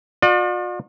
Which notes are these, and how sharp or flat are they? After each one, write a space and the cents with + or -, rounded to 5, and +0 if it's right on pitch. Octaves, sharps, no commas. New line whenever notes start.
F4 +45 D5 +40